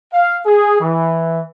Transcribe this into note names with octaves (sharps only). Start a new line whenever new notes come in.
F5
G#4
E3